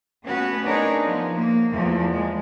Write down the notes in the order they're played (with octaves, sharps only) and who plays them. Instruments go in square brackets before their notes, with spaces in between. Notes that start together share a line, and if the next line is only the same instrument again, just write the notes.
[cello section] A3 B3 C#4 F#4 B4
D4 D#4 G#4 A#4 C#5
F3 B3
A#3
E2 E3 F3 A3 A#3
G#3